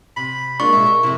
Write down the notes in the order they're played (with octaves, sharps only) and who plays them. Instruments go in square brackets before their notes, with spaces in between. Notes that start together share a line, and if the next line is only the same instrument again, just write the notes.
[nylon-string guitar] C3 [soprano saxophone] B5
[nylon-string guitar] G#3 A#3 D4 [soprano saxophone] F4 [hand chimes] C#6
[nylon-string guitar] B2 G#3 [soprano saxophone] E5
[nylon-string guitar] A#4
[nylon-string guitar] F2 C3 [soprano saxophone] E4